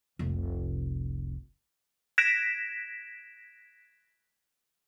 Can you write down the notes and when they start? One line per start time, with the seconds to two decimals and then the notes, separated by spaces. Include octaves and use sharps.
0.19 F1 C2
2.18 F#6 G#6 A#6 B6 D7 E7